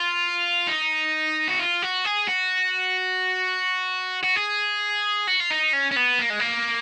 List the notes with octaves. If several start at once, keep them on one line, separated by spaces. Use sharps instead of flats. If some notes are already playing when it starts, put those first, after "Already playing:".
Already playing: F4
D#4
F#4
F4
F#4
G#4
F#4
F#4
G#4
F#4
F4
D#4
C#4
C#4
B3
A#3
G#3
A#3